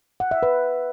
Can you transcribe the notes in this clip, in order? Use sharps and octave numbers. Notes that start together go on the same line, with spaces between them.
F#5
E5
B4